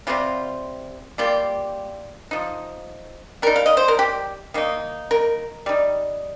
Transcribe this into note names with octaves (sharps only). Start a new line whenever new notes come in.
C3 G3 C4 F4
G3 A#3 F4 G4
F3 D#4
G3 D#4 A#4
F5
D#5
C5
A#4
G4
D#3 A#3 D#4
A#4
G3 D#4